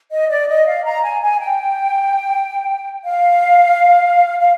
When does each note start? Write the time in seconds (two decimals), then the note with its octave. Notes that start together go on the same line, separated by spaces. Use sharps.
0.11 D#5
0.29 D5
0.48 D#5
0.66 F5
0.85 A#5
1.03 G#5
1.21 G#5
1.39 G5
3.05 F5
4.39 F5